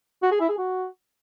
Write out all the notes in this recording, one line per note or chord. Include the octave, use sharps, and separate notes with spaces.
F#4
G#4
E4
G#4
F#4